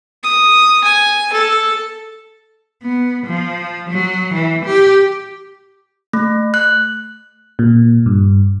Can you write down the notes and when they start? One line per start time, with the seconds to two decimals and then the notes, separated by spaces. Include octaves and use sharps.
0.23 D#6
0.84 G#5
1.33 A4
2.83 B3
3.27 F3
3.90 F#3
4.34 E3
4.65 G4
6.13 A3
6.54 F#6
7.59 A#2
8.06 G2